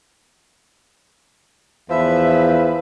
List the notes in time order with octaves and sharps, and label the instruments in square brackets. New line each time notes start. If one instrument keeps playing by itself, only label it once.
[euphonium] E2 [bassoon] F3 [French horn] B4 [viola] E5